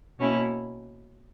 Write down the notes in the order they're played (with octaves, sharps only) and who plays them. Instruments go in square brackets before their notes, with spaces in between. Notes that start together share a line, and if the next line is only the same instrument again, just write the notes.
[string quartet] B2 A#3 C#4 E4